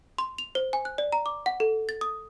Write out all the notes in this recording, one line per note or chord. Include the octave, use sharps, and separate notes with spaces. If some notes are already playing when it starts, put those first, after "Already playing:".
C6
F7
C5
G#5
F#6
D5
A#5
D6
F#5
A4
A6
D#6